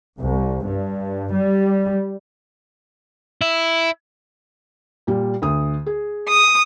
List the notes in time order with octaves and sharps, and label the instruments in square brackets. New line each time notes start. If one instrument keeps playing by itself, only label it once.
[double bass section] C2
G2
G3
[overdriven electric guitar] E4
[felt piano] A#2 G3
D2 D#6
G#4
[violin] D#6